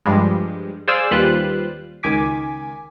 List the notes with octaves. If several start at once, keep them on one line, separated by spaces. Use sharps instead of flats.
G2 F3 G3 G#3
G#4 C5 D5 F5 G#5 E6
D#2 G3 F4 B4 C5 F#6
C#2 D#3 G#5 D6 B6